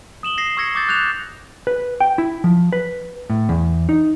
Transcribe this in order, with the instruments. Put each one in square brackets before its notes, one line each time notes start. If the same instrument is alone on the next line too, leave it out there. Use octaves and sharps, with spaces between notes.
[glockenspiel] D#6 E7 F#7 G7
A#6 C7
C#6 E6 G#6 A#6 C#7
D6 D#6 G6 A6
F#6 G6 E7 F7
[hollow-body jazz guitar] B4
G5
E4
F3
B4
A2
E2
D#4